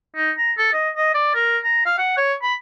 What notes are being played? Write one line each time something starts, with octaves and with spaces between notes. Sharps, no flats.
D#4
A#5
A4
D#5
D#5
D5
A#4
A#5
F5
F#5
C#5
B5